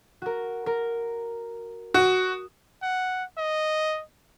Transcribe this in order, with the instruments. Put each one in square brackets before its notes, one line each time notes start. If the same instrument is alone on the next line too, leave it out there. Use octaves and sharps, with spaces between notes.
[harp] F#4 A#4
A#4
[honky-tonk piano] F#4 [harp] D#6
[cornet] F#5
D#5